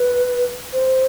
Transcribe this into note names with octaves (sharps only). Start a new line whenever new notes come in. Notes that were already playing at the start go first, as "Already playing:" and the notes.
Already playing: B4
C5